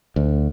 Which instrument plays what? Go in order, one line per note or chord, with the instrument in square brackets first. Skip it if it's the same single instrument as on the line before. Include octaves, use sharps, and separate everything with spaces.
[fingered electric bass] D2